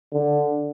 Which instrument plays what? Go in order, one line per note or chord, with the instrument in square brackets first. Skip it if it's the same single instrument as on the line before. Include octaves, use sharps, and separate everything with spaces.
[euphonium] D3